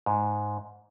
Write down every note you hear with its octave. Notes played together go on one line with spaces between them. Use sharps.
G#2